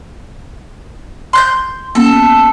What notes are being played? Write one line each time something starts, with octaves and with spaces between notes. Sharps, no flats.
C6 F#6 G6
A#3 B3 C#4 A4